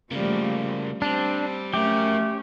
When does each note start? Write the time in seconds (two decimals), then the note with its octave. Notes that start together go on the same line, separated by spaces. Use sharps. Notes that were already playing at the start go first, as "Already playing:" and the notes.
0.12 C#3 F3 G3 A3 A#3
1.02 G3 C4 D4
1.74 F#3 A3 C#4 G4 A#4